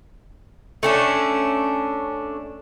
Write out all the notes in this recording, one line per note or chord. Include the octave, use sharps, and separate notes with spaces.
A3 C#4 D4